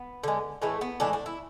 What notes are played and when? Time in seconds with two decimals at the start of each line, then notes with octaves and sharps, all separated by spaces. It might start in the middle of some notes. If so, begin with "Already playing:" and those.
Already playing: B3
0.24 D3 G#3
0.62 A2 E3 G#3 A3
0.81 B3
1.00 A2 E3 G#3 D4
1.13 D4
1.26 E4